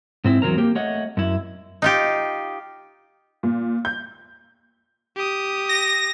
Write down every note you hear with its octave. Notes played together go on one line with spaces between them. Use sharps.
G#2 C4 E4
E2 F#3 G3 C4 A#4 A#5
A#3 G4
A3 C#5 D#5 F#5
F#2 E4
D#4 F4 G4
A#2
G6
G4 D#6
A#6